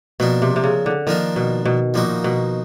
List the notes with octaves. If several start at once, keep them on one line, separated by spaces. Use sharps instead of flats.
B2 F3 A#3 D4
C3
C3
C#3
D3
D#3 F3 A#3 D4
B2
B2
A#2 F3 A#3 D#4 F#4
B2